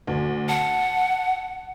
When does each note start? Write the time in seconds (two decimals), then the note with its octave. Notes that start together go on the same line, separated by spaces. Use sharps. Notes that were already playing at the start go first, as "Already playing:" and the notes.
0.07 D2
0.49 F#5 A5